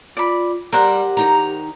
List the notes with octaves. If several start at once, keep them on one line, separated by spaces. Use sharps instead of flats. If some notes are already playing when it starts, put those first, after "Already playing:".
F4 D5 B5
G3 G4 A#4 C5 F#5
D#3 D#4 A#5